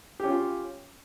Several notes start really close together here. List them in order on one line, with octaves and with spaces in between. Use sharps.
G4 C#4 F4